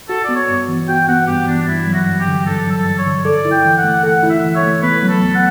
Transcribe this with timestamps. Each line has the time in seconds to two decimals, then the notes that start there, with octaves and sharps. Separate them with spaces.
0.09 F#4 A4
0.24 B3 D5
0.36 C#5
0.48 G2
0.68 E3
0.88 F#4 G5
1.08 B3 F#5
1.27 G2 G4
1.48 E3 D4
1.67 G2 E4
1.87 F#3
1.94 F#4
2.06 G2
2.20 G4
2.26 D3
2.46 G2 A4
2.66 F#3
2.72 A4
2.85 G2
2.99 C#5
3.06 D3
3.25 A4 D5
3.45 E4
3.51 G5
3.65 E3
3.78 F#5
3.84 A3
4.03 A4 F#5
4.23 E4
4.30 E5
4.43 E3
4.56 C#5
4.63 A3
4.83 B3 B4
5.03 F#3
5.09 A4
5.22 D2
5.35 F#5